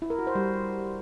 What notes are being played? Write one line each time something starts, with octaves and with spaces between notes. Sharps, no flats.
E4
A#4
F#4
C5
G3